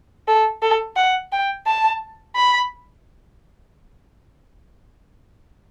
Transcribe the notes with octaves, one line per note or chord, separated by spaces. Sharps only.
A4
A4
F#5
G5
A5
B5